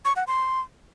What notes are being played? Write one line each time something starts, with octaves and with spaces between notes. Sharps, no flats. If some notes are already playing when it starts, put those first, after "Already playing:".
C#6
F#5
C6